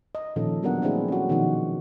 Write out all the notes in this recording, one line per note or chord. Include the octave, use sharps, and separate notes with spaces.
D#5
A#2 D#3 F3 C#4 A4
F#3 G3 B3 D4 A#4 F#5
A3 A#3 C4 D4 E4 G#4
C#4 F#4
B2 D#3 F3 D#4 F#4